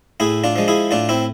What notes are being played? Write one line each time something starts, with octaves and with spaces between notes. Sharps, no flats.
A2 E4 G#4
D4 F4
F3 G#3
E4 G#4
A2 D4 F4
C4 E4